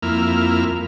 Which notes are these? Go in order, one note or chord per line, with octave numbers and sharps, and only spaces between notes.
F2 A#3 E4 F6